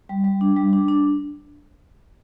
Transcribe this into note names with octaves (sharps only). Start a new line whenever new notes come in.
G3
G3
D4
G3
D4
D4